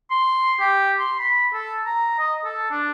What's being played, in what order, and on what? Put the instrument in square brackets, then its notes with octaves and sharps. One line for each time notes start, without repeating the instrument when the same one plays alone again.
[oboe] C6
G4
C6
B5
A4
A#5
D#5
A4
D4